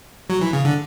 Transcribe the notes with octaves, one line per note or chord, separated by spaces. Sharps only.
F#3
E3
C#3
D3